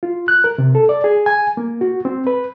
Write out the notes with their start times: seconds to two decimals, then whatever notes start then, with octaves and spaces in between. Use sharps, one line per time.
0.03 F4
0.28 F#6
0.44 A#4
0.58 C3
0.75 A4
0.89 D5
1.04 G#4
1.26 G#5
1.57 A#3
1.81 F#4
2.05 C4
2.27 B4